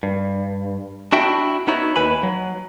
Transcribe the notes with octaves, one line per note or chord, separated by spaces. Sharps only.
G2
D4 E4 F#4 E5 G5
B3 D#4 E4 F#4 C#5
D#2 B4 G#5 B5
F#3